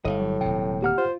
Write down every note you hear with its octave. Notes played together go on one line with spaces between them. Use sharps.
G1 A2 D3 G3 D#5 F5
F#3
D#1 C3 G5
D2 A#3 G4 F#5 A#5 F6
F4 C5